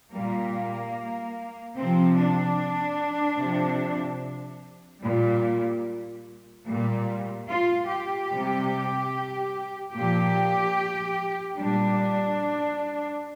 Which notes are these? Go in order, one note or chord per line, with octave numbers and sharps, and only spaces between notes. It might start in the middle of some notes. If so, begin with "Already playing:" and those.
A#2 G3 A#3
C3 F3 C4
D4
C3 F3
A#2 G3
A#2 G3
F4
G4
C3 G3
A#2 F3 G4
A#2 G3 D4